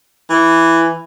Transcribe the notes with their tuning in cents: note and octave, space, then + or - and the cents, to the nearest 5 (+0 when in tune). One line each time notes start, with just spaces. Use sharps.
E3 +5